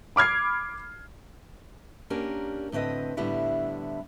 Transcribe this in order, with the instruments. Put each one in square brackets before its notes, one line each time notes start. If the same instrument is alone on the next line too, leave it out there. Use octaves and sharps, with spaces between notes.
[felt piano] B5 D6 F6 G#6 C7
[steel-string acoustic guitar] A#3 C#4 D4 G4 A#4
A2 D3 C4 B4 D#5
A2 D3 G3 B3 E4